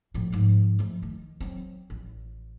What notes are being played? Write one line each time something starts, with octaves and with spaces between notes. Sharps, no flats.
A2 F3
G#2 F3
F3 A3
D#3
F#3 C4
A1